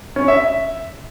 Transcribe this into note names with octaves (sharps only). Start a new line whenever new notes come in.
C#4
E5
E5